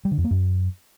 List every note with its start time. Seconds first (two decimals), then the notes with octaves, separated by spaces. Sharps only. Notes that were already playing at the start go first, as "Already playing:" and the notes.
0.05 G3
0.11 D3
0.18 F2
0.24 A#3
0.31 F#2